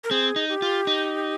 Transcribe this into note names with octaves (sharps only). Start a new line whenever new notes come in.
A#4
C4 G#4
D#4
G4
F4
D#4